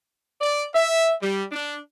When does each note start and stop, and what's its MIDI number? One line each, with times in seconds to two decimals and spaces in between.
0.41 0.65 74
0.73 1.12 76
1.22 1.43 55
1.52 1.76 62